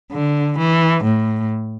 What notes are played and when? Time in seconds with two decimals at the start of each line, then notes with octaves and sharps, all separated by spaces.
0.12 D3
0.59 E3
1.04 A2